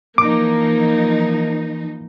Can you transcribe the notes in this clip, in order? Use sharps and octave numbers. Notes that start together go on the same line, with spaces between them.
E3 F3 A#3 D#4 D6